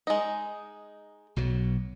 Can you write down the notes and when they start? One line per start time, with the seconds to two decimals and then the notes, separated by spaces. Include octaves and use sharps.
0.07 G#3 D#4
1.36 B1 B2 F#3